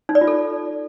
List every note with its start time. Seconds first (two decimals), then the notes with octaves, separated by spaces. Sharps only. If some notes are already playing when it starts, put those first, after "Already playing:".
0.09 D#4
0.15 D5
0.21 F4
0.27 A4